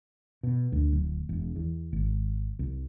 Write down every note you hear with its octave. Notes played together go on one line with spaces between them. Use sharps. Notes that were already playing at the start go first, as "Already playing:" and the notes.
B2
D2
D1
E1
E2
G#1
C2